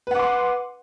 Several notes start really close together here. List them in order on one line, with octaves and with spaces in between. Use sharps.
B4 F#5 D6 C6